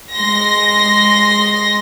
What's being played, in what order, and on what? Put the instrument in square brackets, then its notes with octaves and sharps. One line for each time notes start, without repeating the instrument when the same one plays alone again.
[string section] G#3 C6 A#6